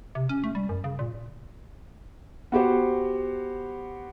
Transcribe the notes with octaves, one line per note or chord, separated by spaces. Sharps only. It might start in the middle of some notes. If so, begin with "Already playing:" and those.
C3
C#4
A3
G3
F#2
C#3
A#2
B3 F#4 G4 C5